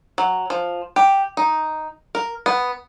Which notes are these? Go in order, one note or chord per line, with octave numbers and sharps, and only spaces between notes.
F#3
F3
G4
D#4
A#4
B3